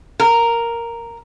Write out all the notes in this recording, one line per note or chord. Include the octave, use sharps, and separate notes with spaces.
A#4